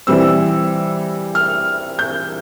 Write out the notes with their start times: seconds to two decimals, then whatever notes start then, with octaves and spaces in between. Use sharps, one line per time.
0.07 E3 G3 C4 E6
1.35 F6
1.99 G6